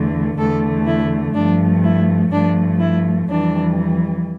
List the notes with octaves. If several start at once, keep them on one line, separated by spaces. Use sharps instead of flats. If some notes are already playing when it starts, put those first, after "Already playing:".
Already playing: E2 D3 A3
E2 D3 A3 A4
E4
G2 F3 A3 D4
E4
G2 F3 A3 D4
E4
F2 E3 G3 D4